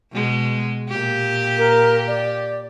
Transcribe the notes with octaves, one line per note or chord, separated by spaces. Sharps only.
B2 G#3
A#2 G4
A#4
D5